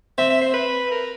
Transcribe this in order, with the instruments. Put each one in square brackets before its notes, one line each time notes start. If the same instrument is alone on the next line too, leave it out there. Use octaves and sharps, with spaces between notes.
[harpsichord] C4 [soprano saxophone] E5
[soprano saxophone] E5
C5
B4
A#4